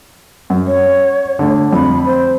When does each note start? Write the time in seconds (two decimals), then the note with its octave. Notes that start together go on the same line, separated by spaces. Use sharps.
0.50 F#2
0.67 C#5
1.39 D3 A3
1.73 F2 B5
2.06 C5